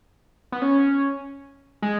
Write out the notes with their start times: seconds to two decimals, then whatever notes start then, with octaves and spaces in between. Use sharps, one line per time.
0.52 B3
0.62 C#4
1.82 G#3